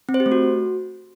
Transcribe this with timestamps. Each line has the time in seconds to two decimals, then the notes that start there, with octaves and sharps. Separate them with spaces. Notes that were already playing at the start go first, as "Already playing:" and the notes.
0.09 C4
0.14 C5
0.20 G4
0.26 A3
0.32 F#4